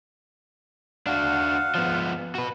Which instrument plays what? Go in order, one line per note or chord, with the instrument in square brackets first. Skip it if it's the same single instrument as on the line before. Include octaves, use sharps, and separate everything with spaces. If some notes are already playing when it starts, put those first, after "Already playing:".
[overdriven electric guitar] D4 F#4 [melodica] F5 F#5
[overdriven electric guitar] F3 B3
F#4 B4